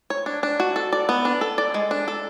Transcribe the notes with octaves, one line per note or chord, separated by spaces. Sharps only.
C#5
D4
D4
F#4
A4
D5
B3
D4
A4
D5
G#3
D4
A4